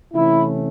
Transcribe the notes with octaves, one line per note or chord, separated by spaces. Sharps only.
C3 E3 A3 C#4 E4